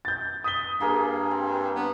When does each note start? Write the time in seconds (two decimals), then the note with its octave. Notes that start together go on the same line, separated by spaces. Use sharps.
0.05 G6 A6
0.44 D#6 B6 G7
0.80 G2 A#3 G#4 A#4
1.31 C4
1.75 B3